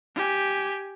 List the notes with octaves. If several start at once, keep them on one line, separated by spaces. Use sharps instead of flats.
G4 G#5